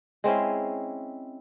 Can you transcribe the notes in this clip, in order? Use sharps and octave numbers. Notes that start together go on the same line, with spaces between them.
G#3 C4 C#4 E4